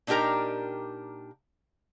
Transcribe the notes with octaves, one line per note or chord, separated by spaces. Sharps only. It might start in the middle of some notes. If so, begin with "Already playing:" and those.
A#2 D4 D#4 G4 A#4 A#5